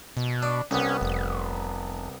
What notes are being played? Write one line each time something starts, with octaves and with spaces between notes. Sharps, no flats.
B2
D4
C2 B3 C#4
F1